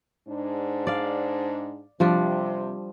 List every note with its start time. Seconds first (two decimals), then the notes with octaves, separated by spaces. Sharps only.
0.27 G#2 D4
0.87 D5 F5
2.00 C3 F3 G3 D4